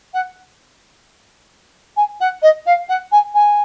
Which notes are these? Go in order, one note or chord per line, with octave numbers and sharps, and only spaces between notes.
F#5
G#5
F#5
D#5
F5
F#5
G#5
G#5